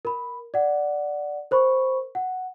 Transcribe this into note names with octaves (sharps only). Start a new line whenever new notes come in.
A#4 B5
D5 F#5
A#4 C5 B5 C#6
F#5